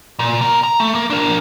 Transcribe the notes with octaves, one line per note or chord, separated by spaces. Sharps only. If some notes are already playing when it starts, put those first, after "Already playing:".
A#2
B2 A#4
A#5
A3
A#3
D4 A#4